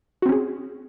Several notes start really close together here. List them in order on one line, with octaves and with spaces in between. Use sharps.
F#4 C4 C#4 G#4